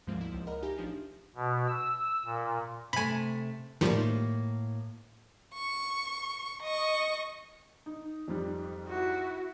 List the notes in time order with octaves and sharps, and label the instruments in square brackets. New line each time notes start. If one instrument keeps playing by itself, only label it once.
[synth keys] D2 G#2 F3 G#3 A#3 C4
E4
C#2 F3
A#4 D#5 F#5 A#5 B5 F6
D#4 G4 E5 G#5 A#6
A1 F3 D4 G#4
[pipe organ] B2
E6
A#2
[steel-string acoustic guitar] C3 A3 [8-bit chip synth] G#5 B5
[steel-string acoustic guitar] A2 A#3 [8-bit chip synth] D#3 F3 G3
[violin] C#6
D#5 C#6
[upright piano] D#4
F2 G#2 G3
[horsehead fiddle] E4 F#4